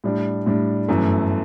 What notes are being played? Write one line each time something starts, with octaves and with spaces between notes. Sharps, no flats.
A2 G3 D4
A2 G3 D4
G1 F#2 E3 A3